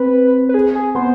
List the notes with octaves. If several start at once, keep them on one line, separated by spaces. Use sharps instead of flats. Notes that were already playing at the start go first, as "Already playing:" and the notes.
Already playing: C4 B4
B4
G#4
G#4
B3 C5